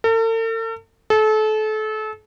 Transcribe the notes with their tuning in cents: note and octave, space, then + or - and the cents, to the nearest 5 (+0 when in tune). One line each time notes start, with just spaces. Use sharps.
A4 +45
A4 -30